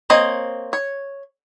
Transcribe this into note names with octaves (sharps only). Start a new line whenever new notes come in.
A#3 C4 C#5 D#5
C#5